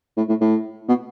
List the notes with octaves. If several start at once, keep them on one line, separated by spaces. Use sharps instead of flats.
A2
A2
A2
B2